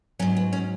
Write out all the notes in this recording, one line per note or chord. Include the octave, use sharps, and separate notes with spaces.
G#2 F#3 C#4
B3
C#4